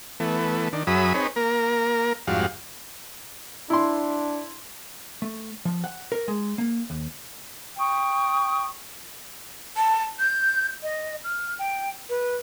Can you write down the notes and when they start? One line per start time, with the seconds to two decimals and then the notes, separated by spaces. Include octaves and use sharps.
0.20 E3 A3 B3
0.73 D#3 D4
0.87 F#2 F#3 G#4 E5 B5 D#6
1.14 C4 D#4 G#4 B4 C#5
1.36 A#3 A#4
2.27 F2 G#2 G3 F#4 F5
3.70 D4 E4 C6
5.22 A3
5.65 F3
5.84 F#5
6.12 A#4
6.28 G#3
6.58 A#3
6.90 D#2
7.79 G5 C#6 D#6
9.76 A5
10.19 G6
10.83 D#5
11.24 F6
11.59 G5
12.09 B4